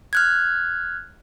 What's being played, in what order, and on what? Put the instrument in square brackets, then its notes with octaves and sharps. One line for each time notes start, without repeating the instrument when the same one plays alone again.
[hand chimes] F6 F#6 G#6